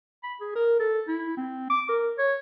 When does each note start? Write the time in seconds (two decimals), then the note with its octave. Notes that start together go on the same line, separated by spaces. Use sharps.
0.23 B5
0.41 G#4
0.55 A#4
0.80 A4
1.08 E4
1.37 C4
1.70 D6
1.89 A#4
2.18 C#5